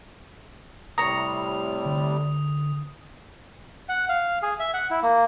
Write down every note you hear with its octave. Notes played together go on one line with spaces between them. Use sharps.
A2 C3 G3 C#5 A#5 D#6
D3
F#5
F5
G#4
E5
F#5
E4
A#3